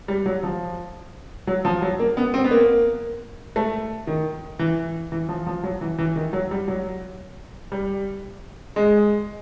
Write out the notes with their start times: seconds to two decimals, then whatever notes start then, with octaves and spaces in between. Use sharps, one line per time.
0.08 G3
0.26 F#3
0.43 F3
1.47 F#3
1.65 F3
1.82 F#3
1.99 A#3
2.17 B3
2.34 C4
2.44 B3
2.51 A#3
3.56 A3
4.07 D#3
4.59 E3
5.12 E3
5.29 F3
5.47 F3
5.63 F#3
5.81 E3
5.98 E3
6.16 D#3
6.33 F#3
6.51 G3
6.68 F#3
7.72 G3
8.76 G#3